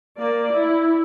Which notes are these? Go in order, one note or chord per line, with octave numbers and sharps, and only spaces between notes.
A#3 D5
E4